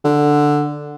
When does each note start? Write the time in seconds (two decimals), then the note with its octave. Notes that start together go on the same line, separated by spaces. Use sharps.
0.04 D3